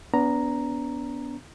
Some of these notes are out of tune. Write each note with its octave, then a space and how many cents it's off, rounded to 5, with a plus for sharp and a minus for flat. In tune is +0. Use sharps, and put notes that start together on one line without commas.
B3 +0 D4 -35 A#5 +0